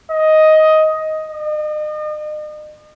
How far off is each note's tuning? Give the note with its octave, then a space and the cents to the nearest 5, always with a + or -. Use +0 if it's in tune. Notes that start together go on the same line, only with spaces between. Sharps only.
D#5 +10
D#5 -40